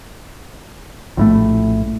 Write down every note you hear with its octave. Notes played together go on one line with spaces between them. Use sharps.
A#1 A2 A3